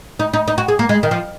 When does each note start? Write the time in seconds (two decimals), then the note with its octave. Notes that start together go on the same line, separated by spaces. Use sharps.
0.19 D#4
0.34 D#4
0.48 D#4
0.58 F#4
0.68 G#4
0.79 A#3
0.89 G#3
1.03 D#3
1.11 F3